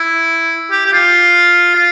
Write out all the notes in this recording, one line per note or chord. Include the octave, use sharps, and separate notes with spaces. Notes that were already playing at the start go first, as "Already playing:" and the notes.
Already playing: E4
G4
G4
F4
F4